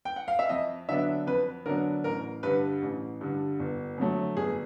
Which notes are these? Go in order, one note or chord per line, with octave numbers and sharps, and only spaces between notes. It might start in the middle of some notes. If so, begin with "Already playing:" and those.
G5
F#5
F5
E5
F2 D#5
D3 F#3 B3 D4 E5
F2 B4
D3 F#3 B3 D4 A#4
A1 A#4
G2 D3 B4
A1
G2 D3
G1
F2 D3 F#3 A3
G1 G#4